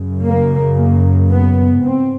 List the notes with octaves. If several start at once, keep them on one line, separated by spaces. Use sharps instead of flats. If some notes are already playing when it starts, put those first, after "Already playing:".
Already playing: F#2 C#3
A#3
A#3
B3
G#2 C4